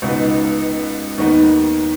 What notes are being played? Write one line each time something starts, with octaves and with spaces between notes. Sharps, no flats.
C#2 B2 B3 D#4
D#2 D#3 B3 D#4